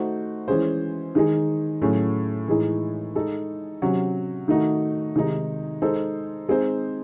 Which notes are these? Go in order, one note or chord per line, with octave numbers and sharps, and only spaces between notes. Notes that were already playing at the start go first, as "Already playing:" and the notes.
Already playing: A3 D#4 F#4 C5
E3 G#3 C#4 G#4 C5
D#3 G#3 D#4 G#4
A2 F#3 A3 C#4 G#4
A2 E3 G#3 D#4 G#4
G#3 D#4 A4
C3 F#3 C#4 F#4
D#3 A3 D#4 F#4
C3 D#3 G#3 D#4
G#3 D#4 A4 C5
G#3 C4 D#4 G#4 C5